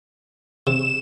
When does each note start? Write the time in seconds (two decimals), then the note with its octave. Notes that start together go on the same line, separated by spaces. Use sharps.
0.67 C3 E7